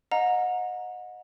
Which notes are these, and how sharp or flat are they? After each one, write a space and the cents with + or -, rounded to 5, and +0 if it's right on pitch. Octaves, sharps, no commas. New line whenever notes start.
D#5 +0 F#5 -30 A#5 +0